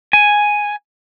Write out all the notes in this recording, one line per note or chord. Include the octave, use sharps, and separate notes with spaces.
G#5